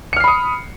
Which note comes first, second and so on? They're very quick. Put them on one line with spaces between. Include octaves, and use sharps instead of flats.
C#7 F6 C7 B5 D#6